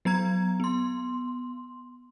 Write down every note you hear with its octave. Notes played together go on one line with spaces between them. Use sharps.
F#3 B3 A#5 G#6
B3 C6